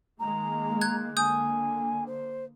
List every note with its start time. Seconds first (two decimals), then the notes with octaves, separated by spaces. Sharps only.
0.19 D#3 G#3 A#3 A#5
0.81 F#6 G#6
1.17 D3 A#3 G#5 D#6 G6
2.06 C5